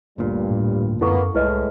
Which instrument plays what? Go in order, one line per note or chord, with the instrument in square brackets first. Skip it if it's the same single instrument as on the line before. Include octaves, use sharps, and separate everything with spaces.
[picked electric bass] G1 D2 A#2 [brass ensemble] G2 G3
[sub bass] A2
[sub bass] F#2 [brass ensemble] A#3 B3 [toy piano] E4 A4 C#6
[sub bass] C2 [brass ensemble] A2 G#3 [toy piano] E4 B4 D#5